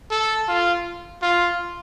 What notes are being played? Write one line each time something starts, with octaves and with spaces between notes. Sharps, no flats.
A4
F4
F4